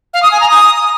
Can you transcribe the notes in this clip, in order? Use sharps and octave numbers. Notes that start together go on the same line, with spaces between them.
F5
D#6
G#5
A#5
D#6